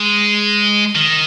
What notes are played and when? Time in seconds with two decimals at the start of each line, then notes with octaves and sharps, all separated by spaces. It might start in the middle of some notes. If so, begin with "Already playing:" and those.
Already playing: G#3
0.95 D#3